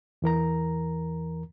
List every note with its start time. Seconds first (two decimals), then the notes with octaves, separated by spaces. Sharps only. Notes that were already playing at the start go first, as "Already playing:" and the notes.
0.22 E2 E3 A#4 A#5